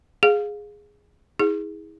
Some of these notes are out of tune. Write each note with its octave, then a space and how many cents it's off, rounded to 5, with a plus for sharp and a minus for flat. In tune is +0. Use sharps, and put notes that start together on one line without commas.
G#4 +0 F5 +20
E4 -40 G#4 -10